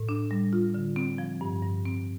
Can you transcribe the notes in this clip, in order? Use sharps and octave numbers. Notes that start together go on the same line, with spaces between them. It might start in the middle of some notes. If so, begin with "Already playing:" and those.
Already playing: A2
D4
G3
F4
D3
C4
F3
G2
G2
C4